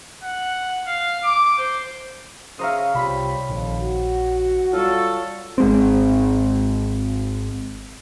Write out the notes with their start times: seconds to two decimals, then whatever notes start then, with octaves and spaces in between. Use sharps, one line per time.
0.24 F#5
0.87 F5
1.24 D6
1.58 C5
2.59 C#3 C5 C#5 E5 F5 A#5 D#6
2.95 C2 G3 F4 B5 B6
3.49 A#1 F2 D#3
3.80 F#4
4.73 F#3 G3 F4 A4 C#6
5.58 G#1 G#3 C4